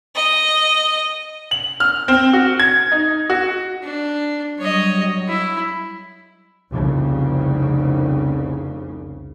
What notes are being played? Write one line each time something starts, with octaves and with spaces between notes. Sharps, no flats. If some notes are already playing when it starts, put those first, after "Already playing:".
D#5
F#7
F6
C4
F#4
G#6
D#4
F#4
D4
F#3 G3 C#5 D#5
E4
F1 C2 C#3